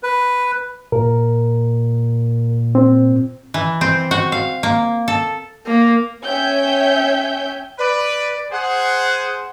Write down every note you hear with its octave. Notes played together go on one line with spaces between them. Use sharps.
B4
A#2 A#4
C4
E3
C4
F#4
F5
A#3
A4
A#3
C#4 C#5 E5 G5 G#5 G6
B4 D5
G#4 C5 F#5